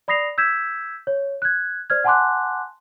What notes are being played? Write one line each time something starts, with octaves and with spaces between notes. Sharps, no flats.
D5 B5 D#6 A#6 C7 F7
E6 G6 G#6 B6 E7
C#5
F#6 G#6
C5 D5 F6 G#6
F#5 G#5 A5 C6 D6 F#6